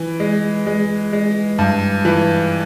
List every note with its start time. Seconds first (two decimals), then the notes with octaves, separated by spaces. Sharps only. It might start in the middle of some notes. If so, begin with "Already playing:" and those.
Already playing: E3
0.20 G#3
0.66 G#3
1.13 G#3
1.58 G2
2.05 E3